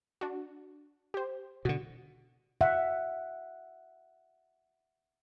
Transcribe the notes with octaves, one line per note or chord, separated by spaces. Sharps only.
D4 F#4
G4 C5
B2 D3 F#4
E5 F#5